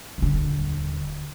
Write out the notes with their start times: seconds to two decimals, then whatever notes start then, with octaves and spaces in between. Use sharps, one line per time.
0.18 D#1 D3